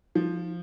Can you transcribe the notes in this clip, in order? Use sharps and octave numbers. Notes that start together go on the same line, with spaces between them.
F3